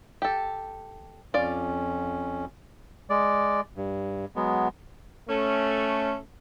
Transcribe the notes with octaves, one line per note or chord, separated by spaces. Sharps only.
G4 A4
F2 C#4 F4 D5
G#3 D5
G2
F#3 G#3 B3
A3 C#4